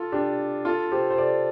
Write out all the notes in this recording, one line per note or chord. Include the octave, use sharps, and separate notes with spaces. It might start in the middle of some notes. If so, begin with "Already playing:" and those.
Already playing: F4 A4
D4 G4
F4 A4
G4 C5
C5
A4 D5